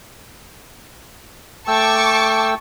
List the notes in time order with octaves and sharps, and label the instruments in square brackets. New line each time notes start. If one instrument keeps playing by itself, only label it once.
[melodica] A3 G5 E6 [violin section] A5 C#6 D6